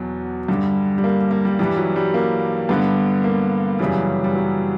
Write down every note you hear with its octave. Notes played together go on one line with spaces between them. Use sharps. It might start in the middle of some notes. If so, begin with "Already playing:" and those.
Already playing: E2 B2 F#3
G2 D3 G3
G3
A#3
A#3
G3
G2 E3 G3
F#3
G3
A#3
G2 D3 B3
A#3
F#2 C#3 E3 G3
G3
F#3